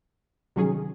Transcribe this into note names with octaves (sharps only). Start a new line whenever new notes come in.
C3 D#3 F#3 C#4 G#4